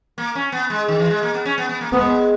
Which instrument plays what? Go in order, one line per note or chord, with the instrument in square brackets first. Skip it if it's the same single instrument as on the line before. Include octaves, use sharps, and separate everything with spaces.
[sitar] A#3
C#4
B3
G#3
D#3
E3
G#3
A#3
B3
C#4
B3
B3
A#3
[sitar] G#3 [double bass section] B3